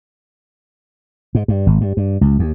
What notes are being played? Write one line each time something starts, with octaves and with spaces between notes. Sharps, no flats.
G#2
G2
G#1
G2
G2
C#2
D#2